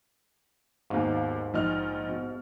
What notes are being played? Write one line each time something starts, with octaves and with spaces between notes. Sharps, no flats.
D#2 G#2 B2 F5
A#1 D#4 F6
B2